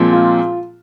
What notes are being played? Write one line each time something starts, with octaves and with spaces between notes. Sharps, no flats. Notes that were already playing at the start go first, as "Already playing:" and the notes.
Already playing: A#2 F3 G#3 C4
F4